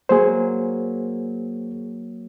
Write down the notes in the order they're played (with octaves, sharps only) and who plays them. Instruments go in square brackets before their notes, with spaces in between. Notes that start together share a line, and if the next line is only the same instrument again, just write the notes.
[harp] F#3 A#3 [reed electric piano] G#4 C5